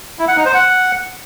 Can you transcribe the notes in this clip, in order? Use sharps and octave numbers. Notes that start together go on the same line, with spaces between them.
E4
F#5
D#4
C5
F#5